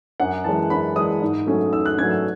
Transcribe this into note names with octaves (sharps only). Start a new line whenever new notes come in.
F#2 F#5
E3 G#3 A5
F#2 B5
E3 G#3 D#6
G#2
F#3 A3 C#4
G#2 E6
F#6
F#3 A3 C#4 G#6
E6